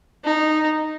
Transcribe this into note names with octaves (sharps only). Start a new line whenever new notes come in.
D#4